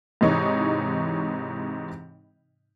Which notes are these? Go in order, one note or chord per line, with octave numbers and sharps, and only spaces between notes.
G#2 C3 E3 D#4 C#5 C#6